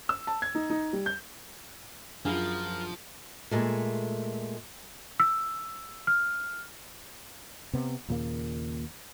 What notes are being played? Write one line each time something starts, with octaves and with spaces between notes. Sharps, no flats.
E6
A5
G#6
D#4
D#4
G3
G6
F#2 F3 D4 F4 G#4 A#4 F5
A#2 G#3 A3
E6
F6
C3 B3
D#2 A#2 C#3 A#3